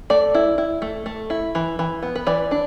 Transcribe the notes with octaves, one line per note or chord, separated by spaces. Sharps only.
A3 D5
E4
E4
A3
A3
E4
E3
E3
B3
B4
E3 D5
D4